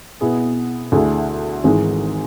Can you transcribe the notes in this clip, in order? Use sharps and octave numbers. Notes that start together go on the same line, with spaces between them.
B2 B3 E4 G#4
D2 D3 A3 E4 G#4
G#1 G#2 E3 G#3